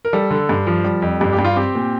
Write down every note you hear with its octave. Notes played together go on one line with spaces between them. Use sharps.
A#4
G3 A4
D3
G2
F3
G3
F2
G2 G4
G4
G2
F4
C4 G4
A#2